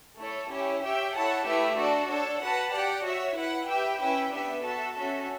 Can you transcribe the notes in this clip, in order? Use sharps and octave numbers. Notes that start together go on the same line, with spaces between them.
A3 E4 A4 C#5
C#4 E4 G4 C#5
G4 C#5 E5 G5
E4 A4 C#5 F#5 A5
A3 E4 G4 B4 E5
D4 F#4 A4 D5
D4 A4 C#5
F#4 B4 F#5 A5
G4 D5 F#5
F#4 C#5 E5
E4 B4 F#5
G4 B4 E5 G5
C#4 E4 B4 E5 G5
B3 D4 G4 B4 E5
F#4 A4 E5 A5
C#4 F#4 A4 E5